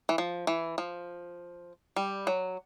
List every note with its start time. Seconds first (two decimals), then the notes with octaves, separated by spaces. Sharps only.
0.09 E3
0.18 F3
0.47 E3
0.78 F3
1.96 G3
2.27 F#3